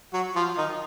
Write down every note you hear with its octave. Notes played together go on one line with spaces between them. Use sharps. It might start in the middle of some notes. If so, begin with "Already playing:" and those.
F#3 F#4
F3 F4
D#3 D#4